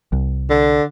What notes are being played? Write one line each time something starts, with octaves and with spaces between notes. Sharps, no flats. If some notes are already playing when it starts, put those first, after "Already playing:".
C2
D3